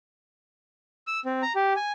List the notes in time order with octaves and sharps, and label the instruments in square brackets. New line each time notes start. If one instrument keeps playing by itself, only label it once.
[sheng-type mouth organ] E6
C4
A#5
G4
G#5